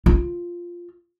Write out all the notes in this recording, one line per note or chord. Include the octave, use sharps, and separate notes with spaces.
F4